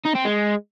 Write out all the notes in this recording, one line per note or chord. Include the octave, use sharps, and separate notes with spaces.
D#4
C4
G#3